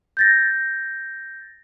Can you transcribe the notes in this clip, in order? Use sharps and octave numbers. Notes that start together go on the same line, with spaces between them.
G6 A6 A#6